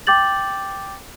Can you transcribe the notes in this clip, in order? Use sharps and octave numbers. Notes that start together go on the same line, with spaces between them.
G5 D6 G6 A6 F#7